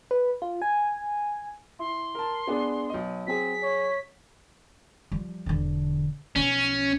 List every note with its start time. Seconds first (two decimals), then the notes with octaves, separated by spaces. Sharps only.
0.11 B4
0.42 F4
0.62 G#5
1.79 E4 C6
2.15 A#4 A5
2.47 B3 D4 G#4
2.90 B1 D#5
3.27 F#3 C4 G#4 B6
3.63 C#5
5.12 F3 G3
5.46 E1 D3
6.36 B1 F3 C#4